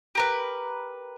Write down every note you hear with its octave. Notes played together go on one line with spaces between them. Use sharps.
G4 A#4 B4